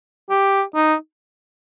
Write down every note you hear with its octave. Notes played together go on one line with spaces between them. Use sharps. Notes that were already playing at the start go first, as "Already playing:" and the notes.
G4
D#4